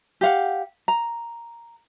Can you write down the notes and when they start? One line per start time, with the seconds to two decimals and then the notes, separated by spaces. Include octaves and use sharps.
0.21 G4 F5 F#5
0.88 A#5